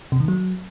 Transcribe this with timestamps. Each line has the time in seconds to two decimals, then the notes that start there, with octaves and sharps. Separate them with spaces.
0.12 C3
0.20 D#3
0.28 F#3